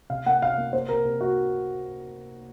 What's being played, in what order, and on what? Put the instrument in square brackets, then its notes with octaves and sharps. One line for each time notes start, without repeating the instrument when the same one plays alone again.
[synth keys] C3 [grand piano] F5
[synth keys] A#3 [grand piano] F#5
[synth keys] C3 [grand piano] F5
[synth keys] A#3
[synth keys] A#3 [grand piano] C5
[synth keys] C3 [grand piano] A#4
[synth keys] C3
[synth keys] C3 [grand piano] F#4